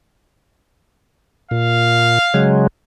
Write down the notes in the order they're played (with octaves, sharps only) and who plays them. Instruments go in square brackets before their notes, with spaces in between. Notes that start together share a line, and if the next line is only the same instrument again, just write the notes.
[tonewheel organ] A#2 [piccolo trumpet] F5
[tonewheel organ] C#3 F#3 G#3